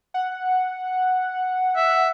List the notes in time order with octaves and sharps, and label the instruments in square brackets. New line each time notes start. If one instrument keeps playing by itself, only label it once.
[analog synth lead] F#5
[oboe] E5